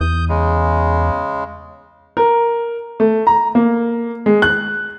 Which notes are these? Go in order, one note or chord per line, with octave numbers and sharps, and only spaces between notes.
E2 D#6 G6
C#3 G#3
A#4
A3
A#5
A#3
G#3
F#6